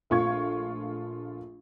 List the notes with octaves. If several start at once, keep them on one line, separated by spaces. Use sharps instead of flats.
A#1 A3 F4 F5 C#6 G#6